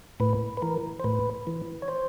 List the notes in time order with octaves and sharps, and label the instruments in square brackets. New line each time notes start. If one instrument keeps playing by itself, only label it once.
[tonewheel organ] A2 B4
B4
E3 A#4
C5
A2 B4
E3
C#5
C5